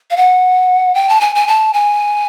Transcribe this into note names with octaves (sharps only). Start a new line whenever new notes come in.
F5
F#5
G5
A5
G#5
G#5
A5
G#5